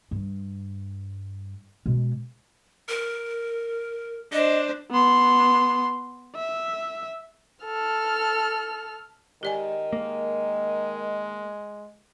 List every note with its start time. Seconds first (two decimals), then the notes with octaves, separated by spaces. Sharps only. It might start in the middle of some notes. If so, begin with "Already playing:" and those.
0.11 G2
1.86 B2 G#3
2.89 A#4
4.32 D4 C5 D#5
4.91 B3 C6
6.36 E5
7.65 A4 F6
9.43 D#3 G#3 G4 D5 G#5
9.93 G#3 A#3